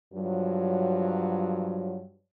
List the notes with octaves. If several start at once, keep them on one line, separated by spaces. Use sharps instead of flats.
G2 F3 F#3